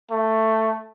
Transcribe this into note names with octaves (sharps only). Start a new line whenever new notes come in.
A3